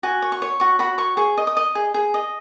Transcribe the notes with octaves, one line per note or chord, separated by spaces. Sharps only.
F#4 G#5
C#5
C#6
C#5
F#4 C#6
F#4 B5
C#5 C#6
G#4 C#6
D#5
D#6
D#5
G#4
G#4
D#5